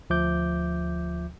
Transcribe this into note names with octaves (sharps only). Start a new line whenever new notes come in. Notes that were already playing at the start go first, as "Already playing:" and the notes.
D2 F3 E5 D6 G6